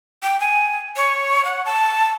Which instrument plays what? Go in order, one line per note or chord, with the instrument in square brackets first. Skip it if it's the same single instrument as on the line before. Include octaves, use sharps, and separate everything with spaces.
[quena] G5
G#5
C#5
F#5
A5